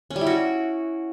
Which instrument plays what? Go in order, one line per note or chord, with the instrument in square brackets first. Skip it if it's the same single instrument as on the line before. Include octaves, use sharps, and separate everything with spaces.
[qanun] C#4
G3
E4
F#4